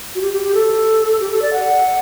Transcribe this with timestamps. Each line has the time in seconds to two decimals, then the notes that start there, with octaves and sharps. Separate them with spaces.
0.15 F#4
0.21 G4
0.32 G4
0.43 G4
0.54 A4
1.20 G4
1.31 A4
1.42 D5
1.53 F#5